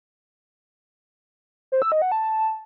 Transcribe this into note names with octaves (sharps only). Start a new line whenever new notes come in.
C5
E6
D#5
F#5
A5